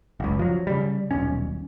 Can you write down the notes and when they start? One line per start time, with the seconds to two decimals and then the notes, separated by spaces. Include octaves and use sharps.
0.20 F#1 C#2
0.39 F3 F#3
0.67 C#3 G3
1.11 D#1 B1 C#4